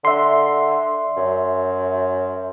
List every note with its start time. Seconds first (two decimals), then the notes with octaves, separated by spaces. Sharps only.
0.05 D3 E5 C6
1.17 F#2